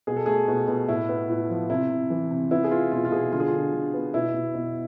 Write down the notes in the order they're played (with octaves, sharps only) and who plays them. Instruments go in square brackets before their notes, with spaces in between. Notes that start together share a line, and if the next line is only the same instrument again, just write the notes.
[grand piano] B2 G#4
A4
A3 G#4
B2
B2
A2 E4
B3
A2
F3
C3 E4
C3
E3
C3
B3 E4
G#4
B3 F4
B2 F4
F4
B2 G#4
D3 F4
G#4
F4
D3
D3
B3
B2 E4
B2
B2